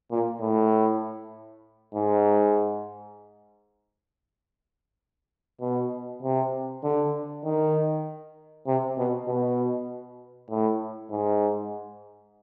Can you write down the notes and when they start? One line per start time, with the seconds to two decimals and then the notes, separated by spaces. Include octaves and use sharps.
0.11 A#2
0.41 A2
1.94 G#2
5.61 B2
6.23 C3
6.83 D3
7.44 D#3
8.67 C3
8.98 B2
9.28 B2
10.50 A2
11.10 G#2